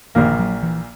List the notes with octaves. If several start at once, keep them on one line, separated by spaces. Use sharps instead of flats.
A#1 A#2 D#3 A#3
F#3
E3